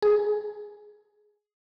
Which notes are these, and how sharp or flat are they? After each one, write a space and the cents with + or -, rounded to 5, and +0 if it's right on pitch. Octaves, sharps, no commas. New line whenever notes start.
G#4 +10